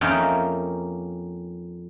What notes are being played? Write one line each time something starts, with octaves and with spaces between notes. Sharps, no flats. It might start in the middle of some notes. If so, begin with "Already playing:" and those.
F2 A#3 C#4 D#4 E5 G5